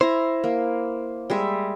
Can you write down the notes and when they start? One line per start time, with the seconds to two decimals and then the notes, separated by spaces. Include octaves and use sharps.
0.01 E4 C5 A#5
0.44 A#3
1.30 G3 G#3 E5